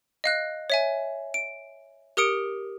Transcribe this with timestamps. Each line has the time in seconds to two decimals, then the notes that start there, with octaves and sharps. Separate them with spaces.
0.24 D#5 F5 F#6
0.70 C#5 E5 G#5
1.34 D7
2.17 G4 A#4 D#6 C#7 D7